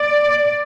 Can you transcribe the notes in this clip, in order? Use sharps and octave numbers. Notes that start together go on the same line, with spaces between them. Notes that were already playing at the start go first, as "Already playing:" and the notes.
Already playing: D5